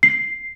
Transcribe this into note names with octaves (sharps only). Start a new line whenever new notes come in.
C7